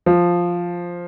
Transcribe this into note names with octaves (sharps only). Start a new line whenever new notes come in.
F3